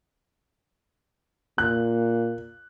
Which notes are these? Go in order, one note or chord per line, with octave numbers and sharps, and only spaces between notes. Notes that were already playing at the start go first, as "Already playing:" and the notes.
A#2 F#6